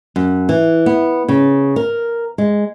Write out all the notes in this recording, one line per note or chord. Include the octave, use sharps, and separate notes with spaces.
F#2
E3
B3
C#3
A#4
G#3